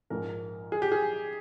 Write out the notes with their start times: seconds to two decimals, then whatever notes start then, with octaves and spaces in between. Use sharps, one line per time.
0.10 A#1 G#2 F3 A#4
0.72 G#4
0.82 G4
0.92 G#4